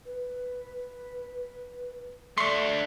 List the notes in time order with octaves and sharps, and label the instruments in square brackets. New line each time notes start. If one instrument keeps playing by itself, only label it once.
[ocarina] B4
[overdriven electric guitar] A3 D4 [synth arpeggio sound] C6 C#6